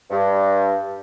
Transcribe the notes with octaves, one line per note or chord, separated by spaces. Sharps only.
G2